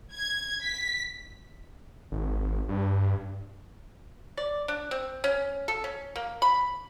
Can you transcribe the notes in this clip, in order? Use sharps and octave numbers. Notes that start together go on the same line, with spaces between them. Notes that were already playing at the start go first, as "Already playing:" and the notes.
G#6
B6
G#1
G2
D5
D4
C4
C#4
A4
C#4
A#3
B5